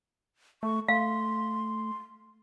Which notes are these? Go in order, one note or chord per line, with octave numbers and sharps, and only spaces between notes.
A3 C#6
A3 F5 C6